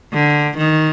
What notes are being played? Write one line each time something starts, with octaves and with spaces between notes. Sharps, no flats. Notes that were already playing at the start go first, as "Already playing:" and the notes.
D3
D#3